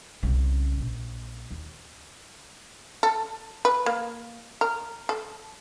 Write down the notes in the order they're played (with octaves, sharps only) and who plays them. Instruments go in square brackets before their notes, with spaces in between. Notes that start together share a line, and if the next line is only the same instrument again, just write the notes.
[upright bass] C2 C#3
A#1
D#2
[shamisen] A4
B4
A#3
A#4
A4